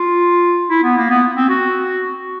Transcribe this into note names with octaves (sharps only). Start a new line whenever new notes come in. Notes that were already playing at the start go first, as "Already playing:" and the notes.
Already playing: F4
E4
B3
A#3
B3
C4
F#4